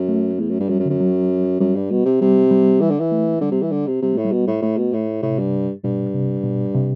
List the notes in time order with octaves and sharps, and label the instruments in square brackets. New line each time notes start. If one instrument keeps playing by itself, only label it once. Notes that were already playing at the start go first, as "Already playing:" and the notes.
Already playing: [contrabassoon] F#2
[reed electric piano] A3
[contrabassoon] E2 [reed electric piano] A3
[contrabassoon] F#2
G2
[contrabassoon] F#2 [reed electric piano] G3
[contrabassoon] F#2
[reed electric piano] D3
[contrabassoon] F#2
[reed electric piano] F#3
[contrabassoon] F#2 [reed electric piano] G3
[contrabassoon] G2
B2
C3
[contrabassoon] C3 [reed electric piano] G3
[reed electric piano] G3
[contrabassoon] E3
D3
E3
[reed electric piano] A3
[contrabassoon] D3 [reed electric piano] G3
[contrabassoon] C3
E3
D3
C3
[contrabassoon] C3 [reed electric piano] G3
[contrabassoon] A2 [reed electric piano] A3
[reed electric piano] G3
[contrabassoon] B2
A2
[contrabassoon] A2 [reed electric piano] A3
[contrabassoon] B2
A2
[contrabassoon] A2 [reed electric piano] C3
[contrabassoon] G2
[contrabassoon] G2 [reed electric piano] B2
[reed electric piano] C3
B2
C3